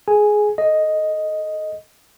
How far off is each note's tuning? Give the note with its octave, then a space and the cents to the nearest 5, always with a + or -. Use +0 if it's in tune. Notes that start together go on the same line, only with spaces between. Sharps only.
G#4 +15 G#5 +0
A4 -15 D#5 +0